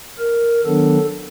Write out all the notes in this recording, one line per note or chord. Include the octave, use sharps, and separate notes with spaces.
A#4
D#3 F#3 B3 D4 A4